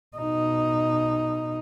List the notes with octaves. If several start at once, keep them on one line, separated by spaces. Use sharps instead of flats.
B2 D#4